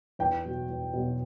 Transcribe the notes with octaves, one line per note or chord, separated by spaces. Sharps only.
E2 G5
B2 F#3
E2
B2 F#3